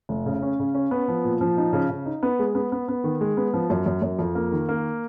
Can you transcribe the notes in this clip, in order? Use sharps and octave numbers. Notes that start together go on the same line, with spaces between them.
F1
C#3
C#4
C#3
C#4
B3
F3
A#2
F3
D#4
C#3
C#3
D#4
B3
G#3
B3
B3
B3
D#3
G#3
B3
F3
F#2
F#2
F#2
F2
A#3
D#3
A#3